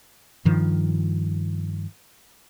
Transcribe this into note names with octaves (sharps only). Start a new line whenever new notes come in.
G2 D#3 F3